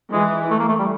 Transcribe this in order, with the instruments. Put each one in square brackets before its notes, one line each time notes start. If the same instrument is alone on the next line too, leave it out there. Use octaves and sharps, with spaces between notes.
[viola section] E3 [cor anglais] G#3
[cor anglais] A3
A#3
A3
G3